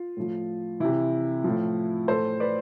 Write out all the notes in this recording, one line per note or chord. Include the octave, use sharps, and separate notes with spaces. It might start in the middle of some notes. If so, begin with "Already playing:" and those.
Already playing: F4
A2 F3
C3 E3 E4
A2 F3
A2 E3 A4 C5
B4 D5